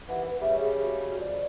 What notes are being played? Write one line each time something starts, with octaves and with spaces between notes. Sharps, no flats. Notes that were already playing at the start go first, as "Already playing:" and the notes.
D#2 E3 F#5
B4
C#3 G3 E5
G#4
F#4
F2 D5